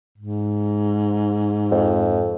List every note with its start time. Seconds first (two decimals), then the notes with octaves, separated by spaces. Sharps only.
0.18 G#2
1.71 F2